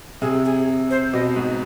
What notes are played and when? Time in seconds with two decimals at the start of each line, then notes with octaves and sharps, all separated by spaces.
0.21 C3 G#4
0.45 G#4
0.90 C5
1.13 B2 D#5
1.36 G#2